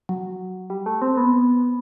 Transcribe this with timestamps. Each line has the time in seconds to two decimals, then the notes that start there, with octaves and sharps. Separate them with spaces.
0.09 F#3
0.70 G3
0.86 A3
1.02 C4
1.17 B3